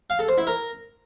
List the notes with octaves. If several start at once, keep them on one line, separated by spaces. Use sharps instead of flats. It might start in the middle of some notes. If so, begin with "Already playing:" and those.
F5
A4
C5
E4
A#4